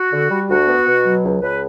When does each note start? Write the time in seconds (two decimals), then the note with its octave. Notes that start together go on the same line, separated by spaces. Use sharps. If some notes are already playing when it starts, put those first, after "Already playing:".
Already playing: F#4
0.12 D3
0.30 G3
0.50 D2 F#4
0.67 B3
0.86 B2
1.04 F#3
1.23 C#2
1.42 C#2 B4